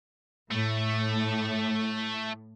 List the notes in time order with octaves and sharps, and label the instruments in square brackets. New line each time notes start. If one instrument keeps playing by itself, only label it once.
[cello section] A2 [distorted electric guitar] A3